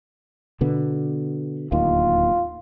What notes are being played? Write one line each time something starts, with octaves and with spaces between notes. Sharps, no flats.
B2 D3 B3
D1 D#2 D#3 F4